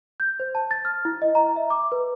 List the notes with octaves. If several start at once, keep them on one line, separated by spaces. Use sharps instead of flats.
G6
C5
A5
A6
F6
E4
D#5
A#5
E5
D6
B4